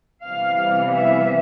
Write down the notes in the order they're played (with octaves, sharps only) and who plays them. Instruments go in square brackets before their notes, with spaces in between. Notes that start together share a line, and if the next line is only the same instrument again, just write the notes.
[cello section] C3 E3 G3 B3 F5
E5